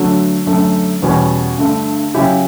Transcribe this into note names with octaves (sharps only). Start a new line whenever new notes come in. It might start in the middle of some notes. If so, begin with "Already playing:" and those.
Already playing: D3 F#3 A3
F#2 D3 A3
E2 B2 G3 C#4
G2 D3 A3
C#3 F#3 C#4 E4 G4